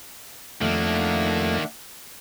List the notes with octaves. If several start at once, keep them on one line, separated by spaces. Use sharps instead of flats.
F2 D#3 A3 A#3 D4 E5 F#5